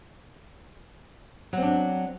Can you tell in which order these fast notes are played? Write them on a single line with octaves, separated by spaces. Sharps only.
F#3 C4 D4